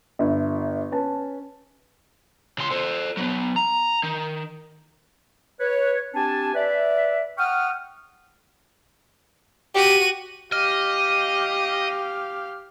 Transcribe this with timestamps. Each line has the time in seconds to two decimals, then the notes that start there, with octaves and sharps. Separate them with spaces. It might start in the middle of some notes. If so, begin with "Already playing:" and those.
0.19 G1 E5
0.91 C#4 B4 A5
2.58 C#3 C6
2.71 A4 C5
3.17 F#3 B3
3.56 A#5
4.03 D#3
5.60 B4 C#5
6.14 C4 D4 G4 G#5 A5
6.55 B4 D5 E5
7.38 F#5 G5 C#6 D#6 F6
9.75 F#4 G4 D#7
10.52 G4 D#5 F5 F6